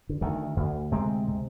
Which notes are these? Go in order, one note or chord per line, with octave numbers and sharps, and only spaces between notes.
D3
D2 D#3
D2
C3 G#3 C4
C3